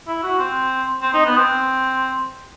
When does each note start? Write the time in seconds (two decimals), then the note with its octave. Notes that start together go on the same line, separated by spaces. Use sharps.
0.07 E4
0.23 F#4
0.39 C4
1.01 C4
1.14 D#4
1.26 B3
1.37 C4